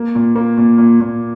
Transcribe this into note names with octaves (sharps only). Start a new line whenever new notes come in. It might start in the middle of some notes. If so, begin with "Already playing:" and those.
Already playing: A#3
A#2
A#3
A#2
A#2
A#2